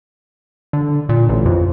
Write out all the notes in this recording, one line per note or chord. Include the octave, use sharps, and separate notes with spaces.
D3
A#2
A1
F2